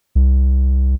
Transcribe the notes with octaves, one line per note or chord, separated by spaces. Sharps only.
C2